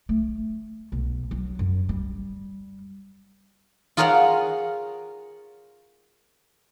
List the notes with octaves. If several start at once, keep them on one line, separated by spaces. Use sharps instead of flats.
A3
B1
F#3
F#2
G3
F4 G#4 A#4 C#5 F5 F#5